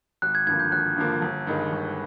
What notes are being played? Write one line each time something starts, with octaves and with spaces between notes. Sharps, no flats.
G#1 F#6
G#6
G2 D3 F3 A#3 G#6
G6
G#1 F#6
G2 D3 F3 A#3
G1
G2 D#3 G#3
G1